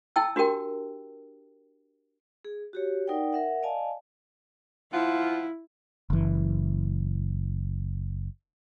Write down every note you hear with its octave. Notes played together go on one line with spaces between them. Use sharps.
E4 G5 A5 E6
D4 F#4 G4 A#4 G5
G#4
F#4 G4 C#5
D#4 A#4 D5 F#5 G5
A#4 E5 F#5
D5 D#5 F5 G#5 A5
F3 E4 F4 F#5
F#1 E3